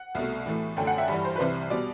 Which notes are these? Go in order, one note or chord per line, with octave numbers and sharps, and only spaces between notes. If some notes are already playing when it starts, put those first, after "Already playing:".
Already playing: F#5
C2 B2 A3
A2 E3 A3
F#2 D3 A3 G5
F#5
E5
G2 E3 G3
C5
B4
C2 C3 E3 G3 C5
B2 G3 D5